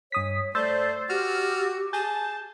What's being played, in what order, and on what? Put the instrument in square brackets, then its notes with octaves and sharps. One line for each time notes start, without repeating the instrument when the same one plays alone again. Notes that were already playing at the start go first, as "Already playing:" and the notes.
[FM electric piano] G2 D#6 B6 [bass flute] C#5
[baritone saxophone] A3 [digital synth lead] C5 [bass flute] D5 [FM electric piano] E6 A6
[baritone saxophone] F#4 [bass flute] G4 [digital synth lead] F6
[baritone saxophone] G#4 [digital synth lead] A5 [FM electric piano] G6